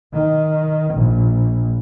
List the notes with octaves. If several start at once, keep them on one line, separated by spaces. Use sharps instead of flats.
D#3
A#1